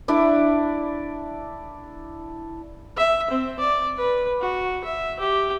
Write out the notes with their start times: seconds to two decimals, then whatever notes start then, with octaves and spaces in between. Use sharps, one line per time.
0.08 D4 E4 D5
2.97 E5
3.30 C4
3.59 D5
3.97 B4
4.40 F#4
4.85 E5
5.19 G4